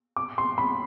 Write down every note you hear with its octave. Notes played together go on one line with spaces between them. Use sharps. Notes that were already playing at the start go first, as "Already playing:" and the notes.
D6
C6
B5